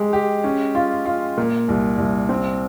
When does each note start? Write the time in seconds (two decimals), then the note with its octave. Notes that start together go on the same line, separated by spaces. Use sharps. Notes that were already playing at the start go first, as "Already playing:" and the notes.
Already playing: G#3 G4
0.13 G4
0.44 C#4
0.75 F4
1.05 F4
1.38 A#2
1.68 C2
1.98 C2
2.29 C4